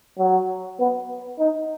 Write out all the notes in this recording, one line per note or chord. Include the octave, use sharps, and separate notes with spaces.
F#3
B3
D#4